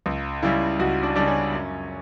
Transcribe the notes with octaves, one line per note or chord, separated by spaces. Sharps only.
C#2
C#3 G3 E4
C#2 F#4
D4
C#3 G3 D4
C#4
F#2